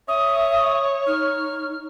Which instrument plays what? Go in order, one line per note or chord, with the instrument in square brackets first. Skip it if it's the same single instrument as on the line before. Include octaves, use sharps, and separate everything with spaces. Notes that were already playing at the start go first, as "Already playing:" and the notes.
[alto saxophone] C#5 [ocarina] E5 [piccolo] D#6
[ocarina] D#4 [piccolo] F6